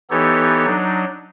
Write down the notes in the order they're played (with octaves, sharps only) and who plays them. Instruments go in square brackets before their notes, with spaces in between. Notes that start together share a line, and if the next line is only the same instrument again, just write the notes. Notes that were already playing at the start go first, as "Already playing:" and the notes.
[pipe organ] E3 B3 D#4 G4 A4 C#5
F#3 D4 D#4